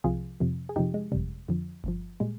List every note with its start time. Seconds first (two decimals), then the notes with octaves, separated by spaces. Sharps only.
0.04 C2 C3 F3 F4 G#4
0.40 F2 C3 F3
0.69 G#4
0.76 F2 C3 F3 D#4 G4
0.94 G#3
1.12 G1 F2 C3 G3
1.48 F2 D3 F3
1.84 G1 G2 F3
2.20 A#2 G3 G#3